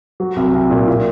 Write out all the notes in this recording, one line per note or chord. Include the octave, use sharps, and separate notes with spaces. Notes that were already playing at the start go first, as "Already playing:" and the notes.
F#3
C2
C2
A#2
A#2